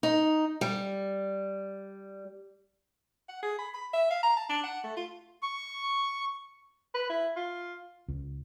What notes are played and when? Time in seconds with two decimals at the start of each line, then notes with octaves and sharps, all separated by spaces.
0.03 D#4
0.61 G3
3.29 F#5
3.43 G#4
3.58 B5
3.74 B5
3.93 E5
4.10 F5
4.23 A#5
4.36 A5
4.49 D4
4.63 F#5
4.84 A3
4.96 F4
5.42 C#6
6.95 B4
7.10 E4
7.37 F4
8.08 C#2